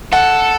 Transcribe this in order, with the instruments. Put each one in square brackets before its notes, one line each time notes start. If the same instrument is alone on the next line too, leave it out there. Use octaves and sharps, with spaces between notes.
[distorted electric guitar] A4 [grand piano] F#5